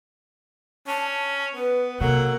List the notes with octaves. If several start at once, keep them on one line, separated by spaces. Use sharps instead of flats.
C#4 A5
B3 B4
C3 F#3 A#3 A4 F#5